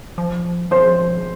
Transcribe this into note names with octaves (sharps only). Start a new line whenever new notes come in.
F3
F3 C5